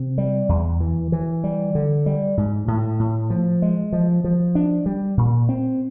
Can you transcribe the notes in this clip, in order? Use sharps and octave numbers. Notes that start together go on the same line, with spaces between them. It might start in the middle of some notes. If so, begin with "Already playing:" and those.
Already playing: C3
G3
E2
E3
E3
G3
D3
G3
G#2
A2
A2
F3
G#3
F3
F3
D4
G3
A#2
C4